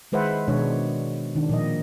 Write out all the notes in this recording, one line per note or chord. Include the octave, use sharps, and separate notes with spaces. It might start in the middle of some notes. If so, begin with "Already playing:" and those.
D#3 G#3 B4 C5 E5 F#5
B2 D#3 G#3 D4 C#5
D#3 D4
A#2 F3 D#5